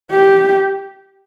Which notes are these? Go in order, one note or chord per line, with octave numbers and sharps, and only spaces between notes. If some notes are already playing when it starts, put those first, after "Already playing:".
G4